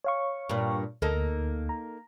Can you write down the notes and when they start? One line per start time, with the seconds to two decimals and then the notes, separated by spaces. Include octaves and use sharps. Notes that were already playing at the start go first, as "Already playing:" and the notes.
0.04 C#5 F5 C#6
0.49 G2 A#2
1.02 D2 A#3 D#4 A4
1.69 A#5